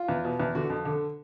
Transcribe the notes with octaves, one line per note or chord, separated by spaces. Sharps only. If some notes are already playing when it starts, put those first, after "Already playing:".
Already playing: F4
E2
B2
E2
D3 F#4
F2
D3